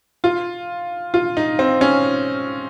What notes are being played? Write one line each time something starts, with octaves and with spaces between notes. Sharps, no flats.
F4
F4
D#4
C4
C#4